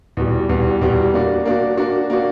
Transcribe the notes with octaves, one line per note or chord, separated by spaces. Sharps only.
E2 B2 G3
E2 B2 G3
E2 B2 G3
A#3 D4 F#4
A#3 D4 F#4
A#3 D4 F#4
A#3 D4 F#4